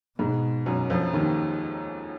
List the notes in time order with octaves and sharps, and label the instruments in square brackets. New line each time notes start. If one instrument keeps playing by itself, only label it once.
[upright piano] G#2 G#3 [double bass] B2
[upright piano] F#2 F#3
F2 F3
D#2 D#3